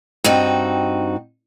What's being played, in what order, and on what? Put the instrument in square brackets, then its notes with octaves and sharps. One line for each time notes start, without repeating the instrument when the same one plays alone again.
[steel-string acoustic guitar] G2 C4 D#4 F#4